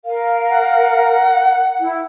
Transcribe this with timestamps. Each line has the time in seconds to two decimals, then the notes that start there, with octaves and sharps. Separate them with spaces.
0.05 A#4 F5
0.49 F#5
1.80 E4